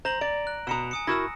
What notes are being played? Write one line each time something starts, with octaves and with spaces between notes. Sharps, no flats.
C5 A#5 A#6 F#7
D5 D7
F#6
B2 A#5 D#6 C#7 E7
G#5 D#6 C#7
E4 F#4 A#4 E6 A#6